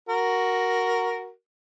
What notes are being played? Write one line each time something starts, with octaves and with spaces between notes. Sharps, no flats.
F#4 A#4